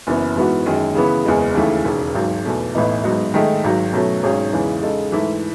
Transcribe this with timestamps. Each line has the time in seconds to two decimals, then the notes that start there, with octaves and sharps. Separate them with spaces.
0.07 F#1 F#2 E3 B3
0.36 G#2 E3 B3 F#4
0.66 F#2 D#3 G#3
0.95 C#3 E3 B3
1.25 F#1 E2 C#3 G#3
1.54 D#2 C#3 E3 A3
1.84 E1 D#2 C#3
2.14 G#1 G#2 F#3
2.45 E2 B2 A3
2.75 A1 A2 E3 B3 D#4
3.04 G#2 F#3 B3 D#4
3.34 G#2 D#3 A3 D#4 G#4
3.64 G#1 G#2 F#3
3.92 B2 F#3 A3 C#4
4.23 G#1 G#2 F#3 C#4 G#4
4.53 E2 C#3 E3 G#3
4.82 C#3 G#3 D#4 A4
5.12 G#2 E3 A3 E4